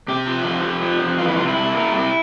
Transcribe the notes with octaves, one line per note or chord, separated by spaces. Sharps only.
C3 G4
F3
F2
F2
F3
F2
E3 F4
E4
C3 F4
E4
C3
A#3
C3